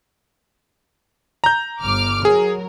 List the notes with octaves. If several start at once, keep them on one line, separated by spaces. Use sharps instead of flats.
A#5 G6
G1 D6 F6
F#3 G#4 A#4